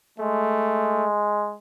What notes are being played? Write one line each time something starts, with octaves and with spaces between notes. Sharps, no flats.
G#3 A3